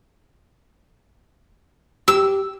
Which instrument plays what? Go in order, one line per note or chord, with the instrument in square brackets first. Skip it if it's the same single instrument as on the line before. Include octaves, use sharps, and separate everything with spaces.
[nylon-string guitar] G4 [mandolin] E6